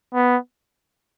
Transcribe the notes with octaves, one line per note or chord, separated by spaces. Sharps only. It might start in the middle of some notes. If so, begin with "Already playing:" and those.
B3